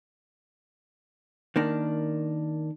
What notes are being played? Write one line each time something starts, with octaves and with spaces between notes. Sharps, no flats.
D#3 A#3 D4